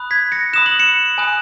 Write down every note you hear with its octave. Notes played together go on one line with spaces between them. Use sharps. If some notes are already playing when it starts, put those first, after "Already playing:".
Already playing: B5 D#6 F#6
G#6 B6
A#6 C#7
B5 D#6 F#6 E7
F#7
C#7 E7
G#5 B5 D#6 F#6